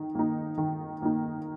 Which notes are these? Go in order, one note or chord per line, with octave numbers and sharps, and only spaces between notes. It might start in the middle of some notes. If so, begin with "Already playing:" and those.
Already playing: D#3 D#4
A#3 D#4
D#3
A#3 D#4